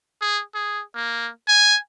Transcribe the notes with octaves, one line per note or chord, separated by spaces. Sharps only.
G#4
G#4
A#3
G#5